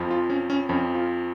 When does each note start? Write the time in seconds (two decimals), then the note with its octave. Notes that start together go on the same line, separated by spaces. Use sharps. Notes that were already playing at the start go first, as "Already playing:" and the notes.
Already playing: F2 F3
0.11 F4
0.30 C#4
0.50 C#4
0.69 F2 F3 C#4
0.95 F4